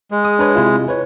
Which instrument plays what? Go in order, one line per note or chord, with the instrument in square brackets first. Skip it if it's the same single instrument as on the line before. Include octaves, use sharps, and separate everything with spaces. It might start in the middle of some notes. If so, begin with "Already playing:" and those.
[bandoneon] G#3
[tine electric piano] D#6
D4 B4 C#5
C3 E4 F4
B4 C#5